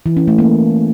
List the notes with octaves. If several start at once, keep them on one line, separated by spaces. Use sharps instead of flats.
E3
C#4
A3
A#3